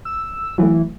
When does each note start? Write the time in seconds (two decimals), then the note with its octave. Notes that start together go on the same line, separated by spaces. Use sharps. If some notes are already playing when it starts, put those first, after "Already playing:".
0.05 E6
0.58 E3 F#3 A3